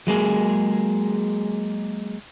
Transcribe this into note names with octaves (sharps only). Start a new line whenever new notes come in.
F#3 G#3 A#3 G#4